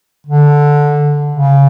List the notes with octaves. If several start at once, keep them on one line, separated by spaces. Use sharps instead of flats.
D3
C#3